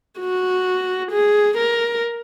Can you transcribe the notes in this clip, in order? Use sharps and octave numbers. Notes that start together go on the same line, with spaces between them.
F#4
G#4
A#4